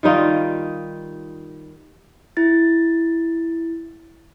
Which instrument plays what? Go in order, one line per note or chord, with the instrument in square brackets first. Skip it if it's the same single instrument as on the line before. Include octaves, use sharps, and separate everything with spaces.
[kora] D#3 G3 D#4 F4
[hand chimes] E4 A6